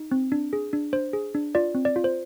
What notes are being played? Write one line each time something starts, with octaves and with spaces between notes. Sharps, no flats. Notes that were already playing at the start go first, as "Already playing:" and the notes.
Already playing: D#4
C4
D4
G#4
D4
D4 C5
G#4
D4
F4 D5
C4
D5
F4
C5